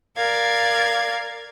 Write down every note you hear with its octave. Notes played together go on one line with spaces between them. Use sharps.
A#4 D5 F5 G#6